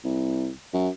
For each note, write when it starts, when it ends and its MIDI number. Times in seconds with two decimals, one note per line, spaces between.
0.04 0.49 36
0.74 0.88 42